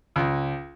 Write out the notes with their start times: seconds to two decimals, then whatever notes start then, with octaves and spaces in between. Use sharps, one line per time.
0.16 C#2